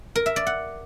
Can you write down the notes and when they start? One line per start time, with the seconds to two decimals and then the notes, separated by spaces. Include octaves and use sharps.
0.16 A#4
0.26 E5
0.36 D5
0.47 F#5